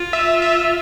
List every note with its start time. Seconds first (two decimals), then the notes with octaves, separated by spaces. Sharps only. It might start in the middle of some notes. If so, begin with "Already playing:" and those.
Already playing: F4
0.13 E5
0.42 E5